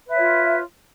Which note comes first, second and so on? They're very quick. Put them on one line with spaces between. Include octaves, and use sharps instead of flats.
B4 E5 C#5 F4